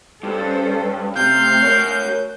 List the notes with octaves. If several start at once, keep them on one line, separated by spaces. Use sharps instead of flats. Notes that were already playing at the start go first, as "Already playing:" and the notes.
G2 C#4 A4 C5
C3 A3 F5 G6
A#4 C#5